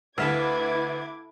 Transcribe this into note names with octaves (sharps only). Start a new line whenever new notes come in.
D2 E4 A4 B4 E5 F5 D6 G#6